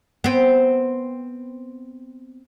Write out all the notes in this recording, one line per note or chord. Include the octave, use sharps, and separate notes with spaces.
B3 C4